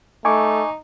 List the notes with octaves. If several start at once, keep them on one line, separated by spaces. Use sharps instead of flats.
A3 D#4 G#5 C#6 D6